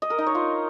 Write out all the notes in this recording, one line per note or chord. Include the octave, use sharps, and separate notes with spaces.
D#5
A#4
D#4
C#5
F4